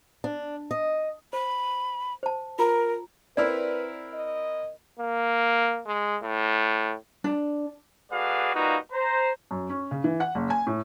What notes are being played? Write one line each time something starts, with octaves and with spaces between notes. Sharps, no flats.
D4
D#5
C5 B5
C5 A5
F4 A#4 A#5
C4 E4 A#4 B4 D5 E6
D#5
A#3
G#3
A2
D4
A3 F#4 G#4 B4 D5 F5
G3 A#3 D#4 F4 F#4 B4
C5 A#5
F#2
C#4
C#3
E3
F#5
F#1
G#5
A2